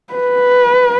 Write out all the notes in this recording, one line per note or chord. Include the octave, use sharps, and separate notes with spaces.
B4